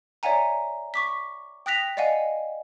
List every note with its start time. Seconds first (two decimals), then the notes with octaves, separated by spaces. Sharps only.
0.23 C#5 D5 E5 F#5 G#5 A#5
0.94 C#6 D6 B6
1.66 G5 D#6 F#6 A#6 B6 F7
1.97 D5 D#5 F5 F#5 G#5